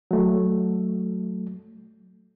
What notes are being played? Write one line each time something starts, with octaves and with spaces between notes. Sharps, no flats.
F#3 A3